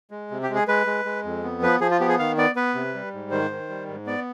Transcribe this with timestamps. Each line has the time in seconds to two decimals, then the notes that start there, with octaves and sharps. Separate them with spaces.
0.11 G#3
0.31 C3
0.43 G4
0.50 G#3
0.55 G#4
0.68 G#3 B4
0.87 G#3
1.05 G#3
1.24 F2
1.44 B3
1.62 F3 B4
1.80 F3 G#4
1.91 F4
2.00 B3 G4
2.09 G#4
2.19 D#3 F5
2.37 B3 D5
2.56 B3 B4
2.75 C3
2.94 G3
3.13 G#2
3.31 D#3 C5
3.50 D#3
3.69 G3
3.88 G#2
4.06 B3 D5